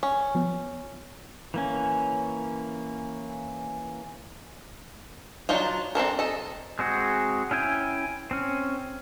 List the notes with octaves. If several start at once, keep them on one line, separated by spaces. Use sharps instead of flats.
C#4
F3 B3
E3 A#3 C#4
F#3 D4 D#4 F4
C4 D4 A4 A#4
A4 D#5
G#3 C4 F#4 G#4
C#4 E4 G5 G#5
C4 C#4